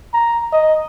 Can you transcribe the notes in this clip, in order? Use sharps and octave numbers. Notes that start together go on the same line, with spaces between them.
A#5
D#5